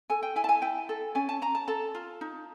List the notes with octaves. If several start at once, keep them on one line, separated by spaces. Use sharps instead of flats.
A4 G#5
G5
E4 G#5
A5
G#5
E4 G5
A4
C#4 G#5
A5
C#4 A#5
A5
A4 A5
F4
D#4